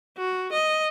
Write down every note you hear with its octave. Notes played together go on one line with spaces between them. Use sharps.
F#4
D#5